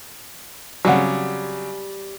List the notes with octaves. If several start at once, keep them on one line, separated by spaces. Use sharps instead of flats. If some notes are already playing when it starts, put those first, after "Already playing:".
C#3 F#3 G3 C4 F#5